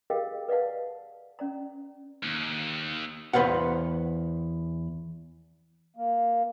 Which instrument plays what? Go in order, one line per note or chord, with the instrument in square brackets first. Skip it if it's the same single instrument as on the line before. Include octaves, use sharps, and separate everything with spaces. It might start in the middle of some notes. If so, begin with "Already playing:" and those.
[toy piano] G4 G#4 A#4 D#5 F5 G5
B4 D5 D#5 F5 F#5 A5
C#4 D5 A#5
[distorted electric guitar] D#2
[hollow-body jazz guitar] E2 B4 C5 F5 F#5
[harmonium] A#3